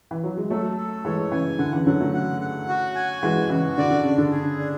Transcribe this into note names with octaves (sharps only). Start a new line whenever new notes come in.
E3
F#3
G#3
F#3 A3 A4
A4
E3 G#3 C#5
C#3 E3 G#5
D3 F#5
C#3 E3
D3 F#3 F#5
F#3 A3
F#5
F#5
F#4
G#5
E3 G#3 F#4
C#3 E3 F#4
D3 D5
D3
C#3 D4
D3
G#4
D4